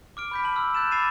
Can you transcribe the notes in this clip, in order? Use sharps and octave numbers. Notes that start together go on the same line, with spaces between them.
D6 F6 D7
B5 G6 B6
A5 F#7
E6 F6
F#6 G6 A6 E7
B5 D6 A6 C7 D#7 E7